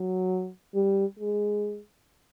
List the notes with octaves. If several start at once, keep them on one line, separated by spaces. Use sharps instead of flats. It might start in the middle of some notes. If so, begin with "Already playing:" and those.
Already playing: F#3
G3
G#3